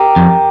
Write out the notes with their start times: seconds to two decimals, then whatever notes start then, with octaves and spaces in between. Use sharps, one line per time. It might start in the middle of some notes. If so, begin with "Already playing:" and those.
Already playing: G4 A#4
0.16 F2